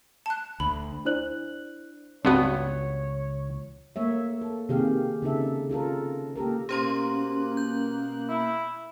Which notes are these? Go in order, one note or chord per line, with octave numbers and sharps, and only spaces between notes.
A5 F#6
D2 B5
D4 E4 C5 D5 F#6 F#7
C#2 G2 B3 C4 F#4 C#5
A3 A#3 C#5 E5
A4
C3 D#3 A#3 G4 G#4 F5
C#3 D#4 A4 E5
C#4 F4 A4 A#4
A#3 G4 A4 A#4
B2 A#3 C#4 G4 C5 C6 F#6
G6
E4